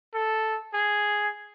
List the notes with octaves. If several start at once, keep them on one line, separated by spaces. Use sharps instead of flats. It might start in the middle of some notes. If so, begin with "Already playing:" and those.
A4
G#4